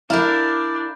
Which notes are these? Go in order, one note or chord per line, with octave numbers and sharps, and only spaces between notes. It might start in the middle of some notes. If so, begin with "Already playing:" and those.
D4 E4 A#4 D5 F5 A#5 B5 G6